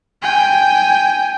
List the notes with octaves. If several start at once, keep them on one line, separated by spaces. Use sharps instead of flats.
G5 G#5